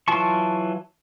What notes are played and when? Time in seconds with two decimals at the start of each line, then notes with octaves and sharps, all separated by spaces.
0.08 E3 F#3 F4 A5 C#6